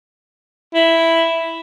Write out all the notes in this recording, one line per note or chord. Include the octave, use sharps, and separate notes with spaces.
E4